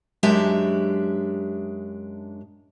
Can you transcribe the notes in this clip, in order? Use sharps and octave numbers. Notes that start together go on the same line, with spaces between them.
F#2 G#3 D4 G4 E5